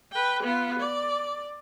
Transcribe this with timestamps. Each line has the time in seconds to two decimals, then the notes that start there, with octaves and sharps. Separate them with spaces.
0.12 B4 G5
0.43 B3 F4
0.79 D5